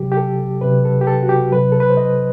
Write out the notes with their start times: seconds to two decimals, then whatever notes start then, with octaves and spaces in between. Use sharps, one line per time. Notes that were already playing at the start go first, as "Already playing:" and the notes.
Already playing: C3 F#3 G4
0.12 G4
0.17 A4
0.61 C3 F#3 B4
0.85 A4
1.01 G4
1.07 A4
1.23 F#4
1.29 G4
1.52 C3 F#3 B4
1.72 A4
1.80 B4
1.90 C5
1.97 D#5